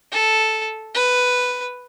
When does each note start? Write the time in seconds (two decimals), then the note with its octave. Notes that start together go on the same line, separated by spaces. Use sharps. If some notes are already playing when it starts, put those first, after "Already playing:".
0.12 A4
0.95 B4